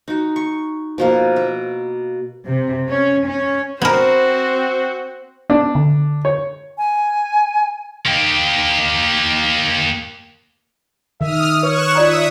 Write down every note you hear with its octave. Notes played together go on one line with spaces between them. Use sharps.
D#4 F#4
C#6
B2 F3 A#3
E5
C3
C#4
C#4
B3 C4 F#4 A#4 C5
B3 D4
D3
C#5
G#5
A#3 G4
D#3 E5 D#6 F6
B4 C#5 C#6 F#6 E7
F4 D5 E5 A#5 D#6